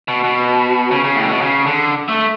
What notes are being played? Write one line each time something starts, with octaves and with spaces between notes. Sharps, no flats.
B2
B2
C#3
C#3
A2
C#3
B2
C#3
D3
A3